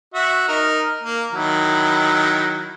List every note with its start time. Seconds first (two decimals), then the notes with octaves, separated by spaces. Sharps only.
0.14 F#4 E5
0.48 D#4 A#4 F6
1.03 A#3
1.33 D#3 F#3 E4